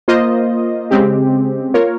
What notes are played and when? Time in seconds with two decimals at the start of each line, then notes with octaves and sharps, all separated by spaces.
0.08 A#3 F4 C5 D#5
0.91 C#3 G#3 C4 G4
1.74 A#3 F4 A#4 C#5